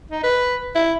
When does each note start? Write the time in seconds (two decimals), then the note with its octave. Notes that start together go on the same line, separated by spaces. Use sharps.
0.11 D#4
0.23 B4
0.75 E4